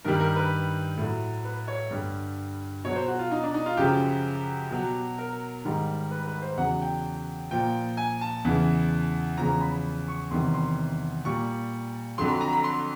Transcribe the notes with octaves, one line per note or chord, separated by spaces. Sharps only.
G2 D#3 G3 A#4
A#4
B4
A2 F#3
B4
C#5
G2 D3 G3
B2 F#3 C#5
C5
F#4
F4
D#4
D4
D#4
F4
F#2 C#3 F3 G4
B2 F#3
A#4
G#2 D#3 G3
B4
B4
C5
E2 C#3 F#3 F#5
G5
A#2 F3 G5
G#5
A5
E2 C#3 E3
E2 C#3 F3 A#5
B5
C#6
E2 C3 D#3 G3 C6
C6
A#2 G3 C#6
F2 D3 F#3 C6
B5
A#5
B5
C6